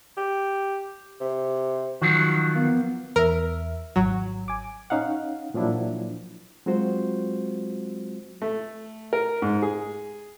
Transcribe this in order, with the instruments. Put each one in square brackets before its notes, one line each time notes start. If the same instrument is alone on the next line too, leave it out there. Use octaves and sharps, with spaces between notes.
[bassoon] G4
C3
[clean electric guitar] D#3 F3 F#3 [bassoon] F#4
[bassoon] A#3 [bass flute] B3
[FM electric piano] E2 E5 [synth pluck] A#4
[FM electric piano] G#1 [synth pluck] F#3
[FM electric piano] G#5 D6
[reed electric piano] C#4 D#4 F5 F#5
A#2 F3 F#3 D4 E4
F#3 G#3 C4 F4 F#4 C5
[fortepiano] A3
A#4
G#2
G#4